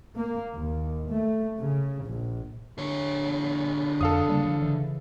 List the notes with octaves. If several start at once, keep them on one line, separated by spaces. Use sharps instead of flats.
A#3
D#2
A3
C#3
A#1
D3 C#5
F2 A4 F5 D#6
C#3 G3 A#3
F3
C#3 E3